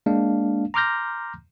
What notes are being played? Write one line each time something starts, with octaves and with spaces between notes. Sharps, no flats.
G#3 A#3 D4 F5
A#5 C6 D6 F6 G6 A#6